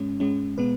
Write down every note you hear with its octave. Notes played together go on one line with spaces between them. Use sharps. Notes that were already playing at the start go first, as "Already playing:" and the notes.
Already playing: G#2 G#3 C#4
G#2 G#3 C#4
B2 G#3 B3 B4